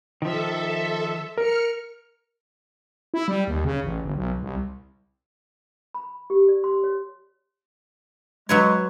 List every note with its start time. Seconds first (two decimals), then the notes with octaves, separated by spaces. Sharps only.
0.22 D#3 F3 A4 E5
1.37 A#4 F6 C#7
3.14 E4
3.28 G3
3.47 D#2
3.65 C#3
3.83 A1
4.03 G1
4.15 B1
4.41 C2
5.94 B5
6.30 G4
6.48 D5
6.64 C6
6.84 C#5
8.49 F#3 G#3 B4 C#5